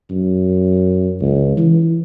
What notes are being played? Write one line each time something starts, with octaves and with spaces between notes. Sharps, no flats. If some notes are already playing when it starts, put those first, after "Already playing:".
F#2
C#2
E3